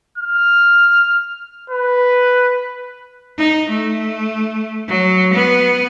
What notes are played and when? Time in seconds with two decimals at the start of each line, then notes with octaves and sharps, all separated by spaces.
0.18 F6
1.70 B4
3.38 D#4
3.69 A3
4.88 F#3
5.34 B3